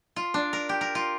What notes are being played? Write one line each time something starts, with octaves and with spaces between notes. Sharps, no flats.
F4
D4
A#4
G4
A#4
F4